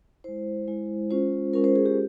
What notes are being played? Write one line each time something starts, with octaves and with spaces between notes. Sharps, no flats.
G#3 E4 C5
G#3 E4
G#3 C#4 F4 C5
G#3 C#4 F4 A#4
C5
G#4
G4